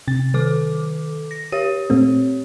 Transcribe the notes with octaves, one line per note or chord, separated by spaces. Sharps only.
C3 A6
D#3 A4 D6
A#6
G4 C#5 D#7
A#2 A3 C4